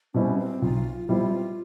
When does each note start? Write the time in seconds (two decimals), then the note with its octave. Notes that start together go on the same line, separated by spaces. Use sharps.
0.14 B2 G3 C4 C#4 E4
0.38 C4
0.61 B1 F4
1.08 B2 G3 C4 E4 F4